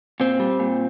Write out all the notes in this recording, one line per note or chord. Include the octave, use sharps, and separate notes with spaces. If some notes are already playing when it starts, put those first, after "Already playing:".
A#2 C4
G3
A#2